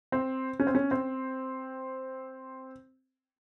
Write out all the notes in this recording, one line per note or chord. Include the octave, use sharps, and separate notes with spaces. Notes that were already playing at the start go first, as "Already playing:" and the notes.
C4
C#4
C4
C#4
C4